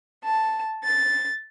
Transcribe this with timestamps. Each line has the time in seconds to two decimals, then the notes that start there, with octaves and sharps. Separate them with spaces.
0.25 A5
0.84 A6